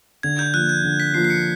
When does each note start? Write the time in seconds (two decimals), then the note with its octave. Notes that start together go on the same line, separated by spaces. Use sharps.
0.23 D3 G#6
0.39 G6
0.54 F3 A#3 F#6
0.69 G6
0.84 D3
1.00 B6
1.14 F3 A#3 C7
1.25 C7
1.30 C#7